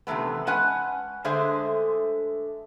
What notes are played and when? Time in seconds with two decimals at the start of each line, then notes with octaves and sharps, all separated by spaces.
0.07 C3 D#3 E3 A3 B3
0.47 G#3 C#4 B4 F#5 G#5 A5
1.25 D3 G#3 A3 G#4 C5 E5